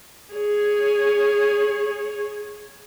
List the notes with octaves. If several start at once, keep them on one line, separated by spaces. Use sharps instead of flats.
G#4 C#5